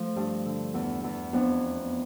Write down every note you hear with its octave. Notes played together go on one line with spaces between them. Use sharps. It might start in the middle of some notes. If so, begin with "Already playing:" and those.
Already playing: F3 A3
G2
D3
E2
E2
F2 B3 D4